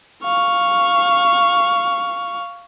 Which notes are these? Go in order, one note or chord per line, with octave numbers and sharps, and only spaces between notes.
F5 C#6